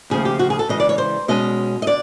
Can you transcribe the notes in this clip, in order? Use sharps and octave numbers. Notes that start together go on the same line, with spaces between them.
D#2 C#3 F3 A3 G#4
G4
F#4
G#4
A4
C#3 E3 G#3 D#5
D5
C#5
C5
B2 G#3 C#4 D#5
D#5
D3 D5